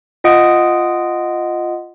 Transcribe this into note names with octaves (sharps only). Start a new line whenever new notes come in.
F4 D#5 F#5 D#6 D7